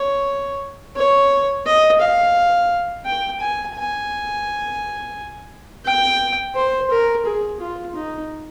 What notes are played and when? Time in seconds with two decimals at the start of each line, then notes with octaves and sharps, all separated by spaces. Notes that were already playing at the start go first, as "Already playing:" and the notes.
Already playing: C#5
0.96 C#5
1.66 D#5
2.01 F5
3.06 G5
3.40 G#5
3.75 G#5
5.85 G5
6.56 C5
6.91 A#4
7.25 G#4
7.60 F4
7.96 D#4